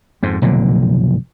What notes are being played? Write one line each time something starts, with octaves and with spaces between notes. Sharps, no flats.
F2 G#2
F1 B1 A#2 D3